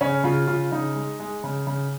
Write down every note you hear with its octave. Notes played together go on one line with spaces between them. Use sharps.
C#3 C#4
C#3 F4
C#3 F4
C#3 D#4
G#3
G#3
C#3
C#3